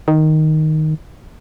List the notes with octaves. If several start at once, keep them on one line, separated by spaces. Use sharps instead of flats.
D#3